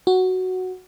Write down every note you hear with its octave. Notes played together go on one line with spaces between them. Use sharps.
F#4